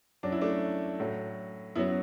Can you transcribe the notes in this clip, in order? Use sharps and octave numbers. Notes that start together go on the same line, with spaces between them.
F#2 F#3 D4
E4
A3 D4
A2 F#3
F#2 F#3 B3 E4